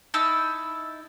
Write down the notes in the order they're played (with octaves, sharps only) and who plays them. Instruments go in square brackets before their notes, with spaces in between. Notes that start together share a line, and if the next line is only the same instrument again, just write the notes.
[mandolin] D#4 E4 A5 E6